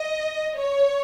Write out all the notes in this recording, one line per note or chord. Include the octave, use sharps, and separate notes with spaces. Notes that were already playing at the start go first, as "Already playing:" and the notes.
Already playing: D#5
C#5